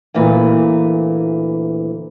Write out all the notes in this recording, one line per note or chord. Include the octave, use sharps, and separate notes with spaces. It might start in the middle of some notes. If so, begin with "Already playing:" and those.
D2 A#2 E3